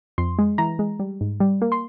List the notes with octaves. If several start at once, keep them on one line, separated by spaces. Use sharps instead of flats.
F2 C6
G#3
E3 A#5
G#3
G3
G#2
G3
A#3
C6